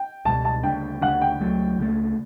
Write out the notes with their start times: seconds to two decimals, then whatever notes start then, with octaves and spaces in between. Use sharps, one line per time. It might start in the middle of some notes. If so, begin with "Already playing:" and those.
Already playing: G5
0.25 C#2 B2 G3 A5
0.45 A5
0.63 D2 C#3 G3 D4 G5
1.01 D2 C#3 G3 D4 F#5
1.21 G5
1.40 C#2 C#3 F#3 A3
1.79 C#2 C#3 F#3 A3